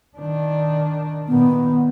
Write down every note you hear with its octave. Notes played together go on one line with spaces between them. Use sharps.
D#3 D4
A#2 D#3 B3